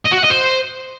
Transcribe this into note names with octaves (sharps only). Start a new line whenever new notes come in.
D#5
F#4
F#5
D#5
C5